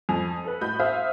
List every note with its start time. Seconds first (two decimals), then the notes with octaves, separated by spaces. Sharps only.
0.09 F2 G#5 A5 D#6 F7
0.44 A4 B4
0.61 A2 F#4 D#5 B5 G6
0.80 C5 E5 F5 D#6 F6 B6